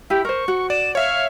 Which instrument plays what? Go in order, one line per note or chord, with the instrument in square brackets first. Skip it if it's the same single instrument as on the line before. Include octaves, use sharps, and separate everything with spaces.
[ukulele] E4 G4 [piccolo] G5
[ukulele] A#4 C5 [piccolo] C#6
[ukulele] F#4
[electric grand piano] D5 [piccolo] E7
[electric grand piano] C#5 E5 [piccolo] F5